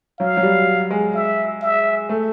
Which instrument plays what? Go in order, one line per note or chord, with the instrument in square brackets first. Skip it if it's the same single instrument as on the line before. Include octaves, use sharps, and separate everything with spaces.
[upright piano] F#3 [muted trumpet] F5
[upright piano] F#3
G3
G#3
[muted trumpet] E5
E5
[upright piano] A3